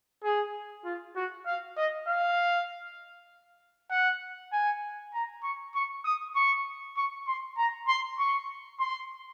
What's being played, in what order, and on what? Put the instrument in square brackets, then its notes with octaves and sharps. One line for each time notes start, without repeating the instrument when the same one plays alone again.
[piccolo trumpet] G#4
F4
F#4
F5
D#5
F5
F#5
G#5
A#5
C#6
C#6
D#6
C#6
C#6
C6
A#5
C6
C#6
C6